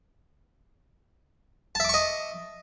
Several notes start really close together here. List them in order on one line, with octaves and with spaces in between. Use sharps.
A5 E5 D6 C#6 D#5